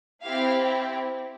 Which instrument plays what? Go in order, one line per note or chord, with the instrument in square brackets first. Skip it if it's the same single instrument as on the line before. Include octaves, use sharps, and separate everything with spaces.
[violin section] C4 E4 G4 F5